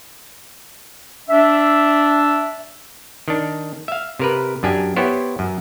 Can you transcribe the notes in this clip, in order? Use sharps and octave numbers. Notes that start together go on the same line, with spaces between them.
D4 E5
D#3 D4
E5 F5
C3 A#4 B4
F#2 D4 G4 G#5
B3 E4 G4 C5 C#5
F#2